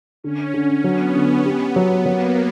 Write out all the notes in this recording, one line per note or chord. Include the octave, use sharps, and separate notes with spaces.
D3 C#4
D3 C#4
F#3 B3
D3
G4
F#3
F#3 A#3